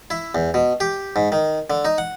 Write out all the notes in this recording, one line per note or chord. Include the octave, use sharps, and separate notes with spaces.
E4
E2
B2
G4
G#2
D#3
D3
D#4
F#5